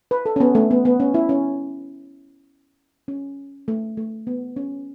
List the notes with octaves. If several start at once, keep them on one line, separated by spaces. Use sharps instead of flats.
B4
A4
C#4
B3
A3
B3
B3
C#4
E4
C#4
C#4
A3
A3
B3
C#4